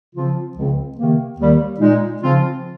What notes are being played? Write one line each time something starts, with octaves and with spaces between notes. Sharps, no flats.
C#3 F3 C4 F4
C#2 C#3 F3 C4
C3 D#3 A#3
D#2 D#3 G3
A#2 G#3 D#4
C#3 F3 C4 F4